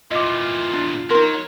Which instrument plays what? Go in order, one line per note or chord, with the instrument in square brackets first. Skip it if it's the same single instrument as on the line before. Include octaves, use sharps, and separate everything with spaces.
[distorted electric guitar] E2 A#2 [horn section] F4 [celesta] D#5 D6
[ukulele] D4
[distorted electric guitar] F#3 [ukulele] D#4 A#4 [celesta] C6